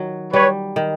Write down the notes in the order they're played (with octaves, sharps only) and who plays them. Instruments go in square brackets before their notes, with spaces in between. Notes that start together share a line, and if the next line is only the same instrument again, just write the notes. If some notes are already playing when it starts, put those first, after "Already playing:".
Already playing: [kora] D#3 F#3
[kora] G3 [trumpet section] B4 C#5
[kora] D#3